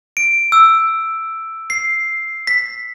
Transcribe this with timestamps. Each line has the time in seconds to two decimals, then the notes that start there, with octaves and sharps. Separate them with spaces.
0.17 D7
0.52 E6
1.70 C7
2.47 B6